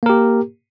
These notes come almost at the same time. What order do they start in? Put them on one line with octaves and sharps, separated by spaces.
A#3 A#4 G4